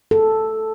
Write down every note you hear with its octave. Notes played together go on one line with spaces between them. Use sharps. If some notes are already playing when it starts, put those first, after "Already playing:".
A4